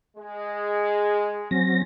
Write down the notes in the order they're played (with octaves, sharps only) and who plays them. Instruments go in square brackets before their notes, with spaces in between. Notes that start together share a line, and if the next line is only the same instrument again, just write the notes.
[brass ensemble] G#3
[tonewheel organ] F#3 C4 A#6 [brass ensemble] C#4